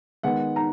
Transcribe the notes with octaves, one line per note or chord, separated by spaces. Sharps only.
D#3 G#3 B3 F#5
A#5